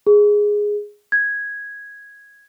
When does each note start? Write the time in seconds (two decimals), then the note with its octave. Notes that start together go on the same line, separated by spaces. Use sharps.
0.07 G#4
1.12 G#6